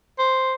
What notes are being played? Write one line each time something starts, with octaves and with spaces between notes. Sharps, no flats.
C5